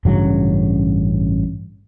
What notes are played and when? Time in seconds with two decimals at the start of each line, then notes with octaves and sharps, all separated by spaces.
0.05 A1 G2 C#3 F#3